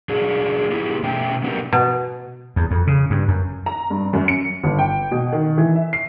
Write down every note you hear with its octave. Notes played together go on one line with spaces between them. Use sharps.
F#3 D4 G#4
B3 E4 G4 G#4
B2 A3 C#4 E5 G5
F#3 B3 D4 F4 G4 A#4
B2
E2
F2
C#3
G2
F#2
A#5
G2
F#2
C#7
G1
G5
B2
D#3
E3
E5
C7